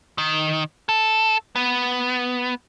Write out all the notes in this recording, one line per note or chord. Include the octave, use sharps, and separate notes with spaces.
D#3
A4
B3